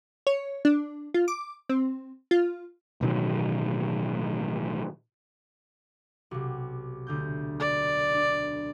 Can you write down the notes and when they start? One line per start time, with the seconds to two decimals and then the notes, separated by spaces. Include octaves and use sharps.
0.27 C#5
0.65 D4
1.14 F4
1.28 D6
1.69 C4
2.31 F4
3.01 A1 B2 D#3 F#3
6.31 B1 C3
7.07 D2 D3 G6
7.59 D5
8.14 D4